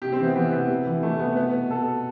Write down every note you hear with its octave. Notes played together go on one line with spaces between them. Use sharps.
C3 G4
C4
E3
B3
E3 B3
C3 B3
C3
E3
E3 A3
C3 B3
B2 B3
B2
B2 A4
B2